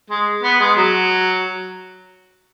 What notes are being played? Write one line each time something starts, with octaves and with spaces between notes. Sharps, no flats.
G#3
B3
G#3
F#3